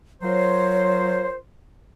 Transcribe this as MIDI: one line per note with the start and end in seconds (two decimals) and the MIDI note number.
0.22 1.27 54
0.22 1.36 65
0.22 1.36 70
0.22 1.36 72
0.22 1.27 73